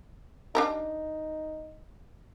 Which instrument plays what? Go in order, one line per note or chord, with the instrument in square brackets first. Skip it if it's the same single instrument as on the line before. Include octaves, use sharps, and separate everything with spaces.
[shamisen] D4 G4 A#4 [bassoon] D#4